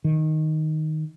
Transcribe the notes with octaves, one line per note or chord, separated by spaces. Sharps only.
D#3